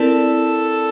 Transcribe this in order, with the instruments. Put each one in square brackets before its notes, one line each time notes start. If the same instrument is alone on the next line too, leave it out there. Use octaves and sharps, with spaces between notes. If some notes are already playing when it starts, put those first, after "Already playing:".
Already playing: [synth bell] C4 E4 A#4 D5 [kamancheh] A4